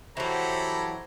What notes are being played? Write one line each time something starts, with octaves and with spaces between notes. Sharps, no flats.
E3 F#3 G4 A4 C5 C#5 A#5 B5